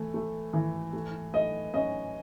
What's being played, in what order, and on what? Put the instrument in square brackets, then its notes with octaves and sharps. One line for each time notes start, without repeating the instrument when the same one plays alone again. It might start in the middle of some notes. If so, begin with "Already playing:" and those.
Already playing: [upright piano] E3 A3
A3
E3
A3
[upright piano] A3 [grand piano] D#5
[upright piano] C#4 [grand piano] D#5